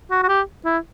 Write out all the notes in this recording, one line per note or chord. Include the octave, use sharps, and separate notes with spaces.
F#4
F#4
G4
E4